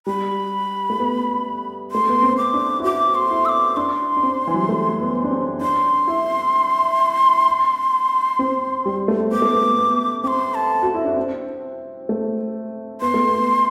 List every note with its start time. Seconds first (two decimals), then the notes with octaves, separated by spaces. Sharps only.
0.07 G3 B5
0.90 A3
0.99 B3
1.92 A3 C6
2.09 B3
2.22 C4
2.38 D6
2.54 D4
2.79 E4
2.84 F#4 D6
3.15 C6
3.31 E4
3.45 E6
3.49 D6
3.77 D4 C6
4.17 D4
4.23 C4
4.47 E3
4.54 F#3
4.61 G3
4.69 A3
5.01 B3
5.24 D4
5.31 C4
5.61 D4 C6
6.07 E4
8.39 C4
8.86 G3
9.08 A3
9.31 B3 D6
9.42 A3
9.53 B3
9.77 B3
10.24 C4 D6
10.27 C6
10.55 A5
10.82 F#4
10.94 E4
11.05 D4
11.16 C4
12.09 A3
13.01 B3 C6
13.14 A3
13.27 B3